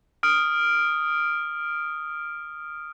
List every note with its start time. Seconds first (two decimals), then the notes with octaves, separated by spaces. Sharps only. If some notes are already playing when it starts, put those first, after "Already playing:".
0.23 D#6 F6 D7